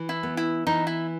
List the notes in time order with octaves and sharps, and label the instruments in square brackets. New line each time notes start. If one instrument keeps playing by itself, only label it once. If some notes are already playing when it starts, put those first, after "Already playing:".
Already playing: [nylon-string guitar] E3
[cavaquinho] E4
[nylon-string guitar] B3
[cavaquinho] E4
[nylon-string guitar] E3 [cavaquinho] D#4
[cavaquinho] E4